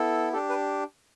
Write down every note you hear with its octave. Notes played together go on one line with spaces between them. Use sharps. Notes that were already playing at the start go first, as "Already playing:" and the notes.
Already playing: B3 E4 A4
D4 G4 A4
B4